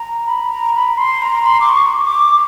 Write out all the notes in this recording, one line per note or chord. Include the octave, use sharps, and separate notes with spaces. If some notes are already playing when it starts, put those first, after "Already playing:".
Already playing: A#5
B5
A#5
B5
C6
A#5
C6
D6
C#6
D6